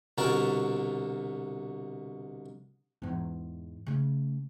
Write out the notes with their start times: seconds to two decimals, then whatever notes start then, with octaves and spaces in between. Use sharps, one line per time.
0.18 C2 B2 D3 F#4 A#4 A5
3.02 E2 G#2
3.87 C#3 A3